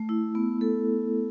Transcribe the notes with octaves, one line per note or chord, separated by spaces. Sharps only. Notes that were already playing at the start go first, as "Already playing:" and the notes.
Already playing: A3
E4
B3
A4